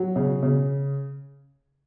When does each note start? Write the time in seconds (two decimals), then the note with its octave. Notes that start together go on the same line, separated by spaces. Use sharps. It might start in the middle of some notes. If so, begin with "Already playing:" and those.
Already playing: F#3
0.16 C#3
0.43 C#3